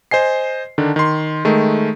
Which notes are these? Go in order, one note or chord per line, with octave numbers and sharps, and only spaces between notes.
C5 D#5 G#5 C7
D3 D#3 D4
D#3 C6
D#3 G#3 A3